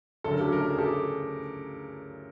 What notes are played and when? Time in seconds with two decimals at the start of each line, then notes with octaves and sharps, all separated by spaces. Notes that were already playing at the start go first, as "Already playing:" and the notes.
0.24 D2 C#3 F#3 A4
0.33 A#4
0.41 G4 A4
0.52 A#4
0.61 A4
0.70 G#4
0.78 G4 A4